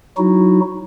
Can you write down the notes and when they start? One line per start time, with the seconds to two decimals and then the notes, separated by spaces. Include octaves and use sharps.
0.17 F#3 D#4 E4 F#4